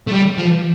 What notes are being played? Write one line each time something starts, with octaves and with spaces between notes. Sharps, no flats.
A3
G3
F3